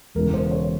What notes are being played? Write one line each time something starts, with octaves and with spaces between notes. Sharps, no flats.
E1 E2 C#3 E3 A#4
C5
C#5